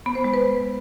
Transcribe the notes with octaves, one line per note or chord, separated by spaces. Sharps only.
B3
C5
G#3
B4